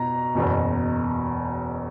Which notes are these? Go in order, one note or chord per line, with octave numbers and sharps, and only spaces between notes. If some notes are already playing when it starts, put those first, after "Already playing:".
Already playing: B2 A#5
F#1 E2 B2